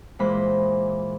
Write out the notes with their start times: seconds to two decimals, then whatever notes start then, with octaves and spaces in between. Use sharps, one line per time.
0.19 A#2 E3 G#3 C5 B5